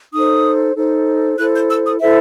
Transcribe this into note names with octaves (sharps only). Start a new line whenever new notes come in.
D#4 A4 C5 D#6
D#4 A4 C5
E4 A4 C5 F#6
G6
E6
D#6
E4 A4 C5 E5